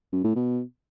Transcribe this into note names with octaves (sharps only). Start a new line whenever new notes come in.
F#2
A2
B2